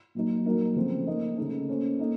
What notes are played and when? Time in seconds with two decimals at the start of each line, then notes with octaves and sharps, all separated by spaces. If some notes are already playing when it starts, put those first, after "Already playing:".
0.15 A#2 F#3 A#3 D#4
0.46 F#3 A#3 D#4 A#4
0.76 C#3 F3 A3 C4
1.07 A#3 D#4 A#4 D#5
1.37 C#3 A3 D#4 A4
1.69 A#3 C#4 A4 C5
1.99 A#3 D#4 A4 D#5